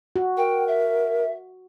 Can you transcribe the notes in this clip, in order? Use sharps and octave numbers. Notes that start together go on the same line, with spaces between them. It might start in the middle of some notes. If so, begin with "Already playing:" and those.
F#4
A#4 G5
E5